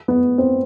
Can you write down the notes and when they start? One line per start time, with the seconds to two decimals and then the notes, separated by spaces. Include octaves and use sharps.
0.08 B3
0.38 C4